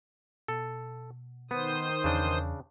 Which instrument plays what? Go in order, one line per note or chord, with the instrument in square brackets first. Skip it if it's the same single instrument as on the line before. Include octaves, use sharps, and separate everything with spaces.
[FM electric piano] B2 [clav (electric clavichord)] A4
[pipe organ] D#3 C5 D#6 [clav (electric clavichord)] B3
[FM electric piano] E2 [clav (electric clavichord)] C#3 D4